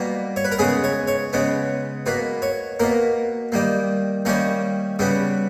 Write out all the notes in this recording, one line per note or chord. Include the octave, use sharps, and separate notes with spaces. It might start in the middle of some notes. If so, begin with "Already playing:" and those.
Already playing: B2 G3 A#3
C#5
B4
A#4
C#3 G#3 B3 G#4
C#5
C#5
C#3 G#3 B3
B2 A#3 B4
C#5
B2 A#3 A#4
D#3 G3 A#3
D#3 G3 A#3 C#4
C#3 G3 B3